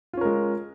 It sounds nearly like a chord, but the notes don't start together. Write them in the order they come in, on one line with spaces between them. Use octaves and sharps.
F4 C#4 A#4 G#3